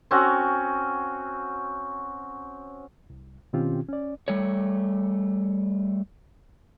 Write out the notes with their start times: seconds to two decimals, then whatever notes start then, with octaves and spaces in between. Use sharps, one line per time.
0.11 C4 C#4 F#4
3.10 C2
3.53 B2 D#3 C4 C#4 F4 G4
3.89 C#4 D5
4.28 G3 A3 C#5